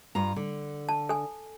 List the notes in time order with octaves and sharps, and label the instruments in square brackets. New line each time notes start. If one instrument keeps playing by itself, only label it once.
[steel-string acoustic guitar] G2 F4 A#5
D3
[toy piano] A5
A4 G#5